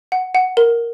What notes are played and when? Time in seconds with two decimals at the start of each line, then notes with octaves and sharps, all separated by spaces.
0.12 F#5
0.35 F#5
0.57 A#4